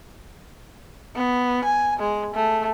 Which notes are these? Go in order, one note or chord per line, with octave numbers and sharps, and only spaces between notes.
B3
G#5
G#3
A3